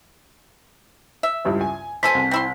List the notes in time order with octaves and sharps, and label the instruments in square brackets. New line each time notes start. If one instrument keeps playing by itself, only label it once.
[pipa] E5
[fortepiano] C#2 G2 E4
G#5
[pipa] B2 A4 G#5 [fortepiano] C5 [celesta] B6
[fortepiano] C2
[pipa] C4 E4 C6